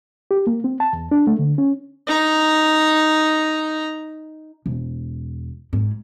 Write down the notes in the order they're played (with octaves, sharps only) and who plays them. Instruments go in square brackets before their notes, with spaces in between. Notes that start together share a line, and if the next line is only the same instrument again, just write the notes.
[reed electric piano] G4
A#3
C4
A5
E2
D4
A3
D3
C#4
[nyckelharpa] D#4 A#5
[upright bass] E1
G#2